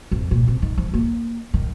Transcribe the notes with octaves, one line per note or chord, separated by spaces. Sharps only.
F2
A#2
C3
D#3
F3
A#3
D#3